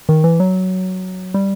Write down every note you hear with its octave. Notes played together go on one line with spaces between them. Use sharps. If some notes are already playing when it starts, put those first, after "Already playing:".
D#3
E3
F#3
G3